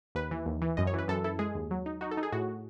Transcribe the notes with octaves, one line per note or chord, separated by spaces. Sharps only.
D#2 B4
E3
D#2
E3
F#2 D#5
C#5
E3 B4
F#2 A4
E4 A4
G#3 G#4
D#2
F#3
D#4
D#4 F#4
A4
D#4
G#4
A2 F#4